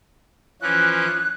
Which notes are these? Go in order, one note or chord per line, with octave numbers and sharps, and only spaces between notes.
E3 F3 C#4 F#6